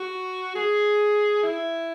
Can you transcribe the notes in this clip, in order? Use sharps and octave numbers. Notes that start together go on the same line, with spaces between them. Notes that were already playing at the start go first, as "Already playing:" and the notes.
Already playing: F#4
G#4
E4